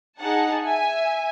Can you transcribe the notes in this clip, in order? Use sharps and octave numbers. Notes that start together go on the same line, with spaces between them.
D#4 G#4 F#5 A5
E5 G#5